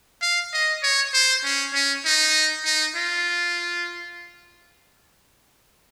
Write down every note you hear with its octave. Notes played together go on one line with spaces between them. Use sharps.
F5
D#5
C#5
C5
C#4
C#4
D#4
D#4
F4